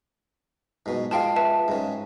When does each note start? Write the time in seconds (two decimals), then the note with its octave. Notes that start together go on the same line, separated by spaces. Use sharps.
0.86 G#2 B2
1.11 F3 G#3 F4 F5 G5 A5
1.36 B4 E5 A5
1.68 G#2 C#3